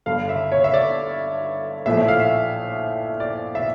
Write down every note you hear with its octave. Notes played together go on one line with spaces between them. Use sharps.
G1 G2 D3 F5
E5
C#5
E5
D5
A#1 A2 F3 A3 E5
E5
F5
E5
D5
E5